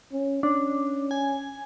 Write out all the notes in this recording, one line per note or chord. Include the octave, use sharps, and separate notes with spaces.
C#4
C#4 D4
G#5